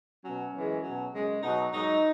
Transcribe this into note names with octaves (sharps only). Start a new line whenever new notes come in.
B2 F#3 C#4
F#2 E3 G#3
B2 F#3
F#2 C#3 G#3
B2 F#3 D#4
G#2 F#3 D#4